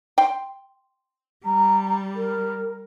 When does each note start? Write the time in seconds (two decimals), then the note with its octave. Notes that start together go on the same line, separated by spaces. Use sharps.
0.18 G5 C6
1.45 G3 A#5
2.15 A#4